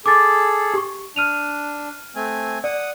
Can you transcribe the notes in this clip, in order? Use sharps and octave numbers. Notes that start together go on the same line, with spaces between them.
G#4 A4 D6 A6
G4 C#6
D4 F6 D#7 F7
A3 C4 G#5
D5 F#5 D#6